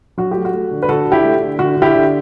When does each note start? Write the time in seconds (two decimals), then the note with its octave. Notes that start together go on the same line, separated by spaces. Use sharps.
0.18 F#3 F#4
0.31 A3 G4
0.45 F#4
0.53 A3
0.71 D3
0.83 B4
0.88 D3 F#4 A4
1.06 D3
1.12 E4 G4
1.24 A3
1.41 D3
1.59 D3 F#4
1.76 D3
1.82 E4 G4
1.94 D3